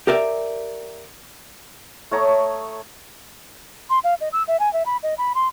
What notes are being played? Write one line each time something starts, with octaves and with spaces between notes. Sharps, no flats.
G4 A#4 D5 E5
A3 C#5 A#5 D#6
C6
F5
D#5
E6
E5
G#5
E5
B5
D#5
B5
C6